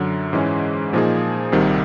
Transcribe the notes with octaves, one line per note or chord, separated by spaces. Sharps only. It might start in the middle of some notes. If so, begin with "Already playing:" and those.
Already playing: F#2 D3 F#3
G#2 E3 G#3 C#4
A#2 F3 A#3 D#4 G#4
C2 C3 D#3 G3